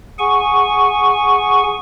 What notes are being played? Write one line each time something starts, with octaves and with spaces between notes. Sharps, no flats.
G#4 F#5 G#5 C#6